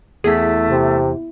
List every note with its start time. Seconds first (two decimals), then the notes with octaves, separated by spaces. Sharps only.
0.24 E2 A3 G#4 B6
0.69 C3